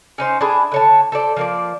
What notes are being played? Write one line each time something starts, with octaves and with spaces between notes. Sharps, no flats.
C#4 D#4 C5
D4 E4 G#4
D3 C#5 A5
A4 C5 D5
F3 A#3 D5